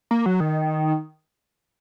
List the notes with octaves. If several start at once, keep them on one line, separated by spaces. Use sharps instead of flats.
A#3
F#3
D#3